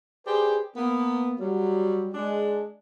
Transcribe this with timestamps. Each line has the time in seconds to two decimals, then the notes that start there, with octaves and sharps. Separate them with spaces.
0.26 G4 G#4 B4 C5 D5 G5
0.76 A#3 B3
1.39 F#3 G3
2.14 G#3 D4